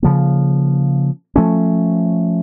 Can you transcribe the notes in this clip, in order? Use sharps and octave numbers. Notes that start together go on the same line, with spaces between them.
C#3 F3 A#3
F3 A3 C#4